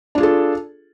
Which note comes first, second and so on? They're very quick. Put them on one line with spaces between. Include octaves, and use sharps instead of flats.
D4 F4 G#4 A4